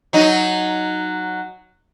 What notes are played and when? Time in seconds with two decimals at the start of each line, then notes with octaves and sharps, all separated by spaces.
0.13 F#3 D#4